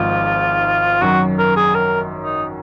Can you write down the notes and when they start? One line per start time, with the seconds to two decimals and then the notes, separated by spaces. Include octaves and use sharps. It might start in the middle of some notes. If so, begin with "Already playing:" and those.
Already playing: G#1 G#2 F3 F4
1.02 F#2 D#3 F#3 F#4
1.39 A#4
1.56 G#4
1.75 A#4
2.24 D#4